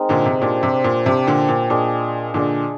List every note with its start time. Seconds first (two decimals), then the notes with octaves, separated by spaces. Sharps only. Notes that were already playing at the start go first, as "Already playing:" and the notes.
Already playing: G#3 C4 D#4 A#4
0.09 A#2 D3
0.26 C3
0.42 A#2 D4 G4 C5
0.63 C3
0.84 A#2
1.06 C3 D4 G4 C5
1.27 A#2 D3
1.49 A#2
1.70 A#2 D4 G#4 D#5
2.34 A#2 D3 D4 G#4 D#5